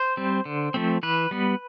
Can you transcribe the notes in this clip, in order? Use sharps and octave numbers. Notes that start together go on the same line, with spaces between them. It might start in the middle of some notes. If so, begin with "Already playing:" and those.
Already playing: C5
G3 C4
D3
F3 A3 C4
E3 B4
G3 B3